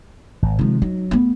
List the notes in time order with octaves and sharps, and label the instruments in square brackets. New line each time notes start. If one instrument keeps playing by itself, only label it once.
[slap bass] G#1
[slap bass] C3 F3 [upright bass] D#3 G#3
[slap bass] F#3 [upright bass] D#4
[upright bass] A3 B3